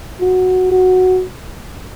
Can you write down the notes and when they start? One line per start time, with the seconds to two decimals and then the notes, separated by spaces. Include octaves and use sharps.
0.20 F#4
0.71 F#4